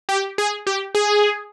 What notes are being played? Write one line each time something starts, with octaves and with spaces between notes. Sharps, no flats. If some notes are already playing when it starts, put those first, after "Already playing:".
G4
G#4
G4
G#4